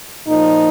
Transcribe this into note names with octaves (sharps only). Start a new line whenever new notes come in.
A#2 F3 D#4